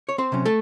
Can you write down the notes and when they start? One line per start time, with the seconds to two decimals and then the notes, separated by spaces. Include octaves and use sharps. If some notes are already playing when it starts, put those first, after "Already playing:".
0.09 C#5
0.18 C4 C5
0.32 C3 F#3 C#4
0.45 A3 A4